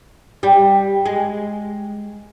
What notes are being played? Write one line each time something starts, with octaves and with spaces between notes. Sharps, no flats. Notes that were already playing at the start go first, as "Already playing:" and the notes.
G3
G#3